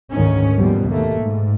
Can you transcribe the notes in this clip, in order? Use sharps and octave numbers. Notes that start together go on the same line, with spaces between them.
D2 G#2 D#3 C#4
D#2 B2 F3 G3
D#2 A3 A#3
G#2